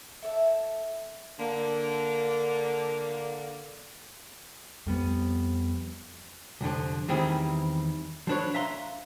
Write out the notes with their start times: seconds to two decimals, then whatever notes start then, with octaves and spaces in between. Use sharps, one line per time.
0.22 E4 A4 C#5 E5
1.39 D3 A#3
4.86 F2 G3 B3
6.61 C2 F2 D3 F3
7.08 E2 D#3 G3 C4 E4 G#4
8.27 F3 F#3 D4 B4 C#5
8.55 E5 F5 A#5 C6